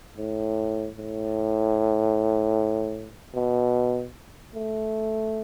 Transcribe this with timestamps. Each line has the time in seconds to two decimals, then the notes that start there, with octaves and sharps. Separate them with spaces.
0.18 A2
0.98 A2
3.35 B2
4.55 A3